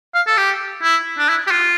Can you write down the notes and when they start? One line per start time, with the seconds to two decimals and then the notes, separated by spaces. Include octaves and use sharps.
0.15 F5
0.27 A4
0.37 G4
0.83 E4
1.18 D4
1.29 E4
1.47 G4
1.51 F4